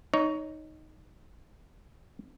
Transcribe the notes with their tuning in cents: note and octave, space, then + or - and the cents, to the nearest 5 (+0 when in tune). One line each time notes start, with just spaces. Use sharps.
D#4 +0 C#5 +20